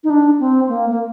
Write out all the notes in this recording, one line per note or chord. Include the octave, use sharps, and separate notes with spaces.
D#4
D4
C4
A#3
A#3